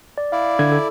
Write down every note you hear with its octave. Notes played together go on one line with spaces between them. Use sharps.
D5
E4 D5 F5
D3 G#6
A4